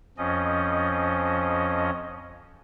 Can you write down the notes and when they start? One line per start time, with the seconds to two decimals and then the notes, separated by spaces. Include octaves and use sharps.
0.18 F2 F3 C#4 D#5